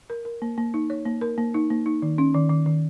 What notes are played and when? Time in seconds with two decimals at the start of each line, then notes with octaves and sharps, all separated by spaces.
0.10 A#4
0.25 A#4
0.42 A#3
0.58 A#3
0.74 D#4
0.90 C#5
1.06 A#3
1.21 A#4
1.38 A#3
1.54 D#4
1.70 A#3
1.86 D#4
2.02 D#3
2.18 C#4
2.34 D#3
2.50 D#3
2.66 D#3